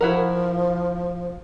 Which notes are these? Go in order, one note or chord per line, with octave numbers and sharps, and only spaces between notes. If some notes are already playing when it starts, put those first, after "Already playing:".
F3 E4 F#4 A#4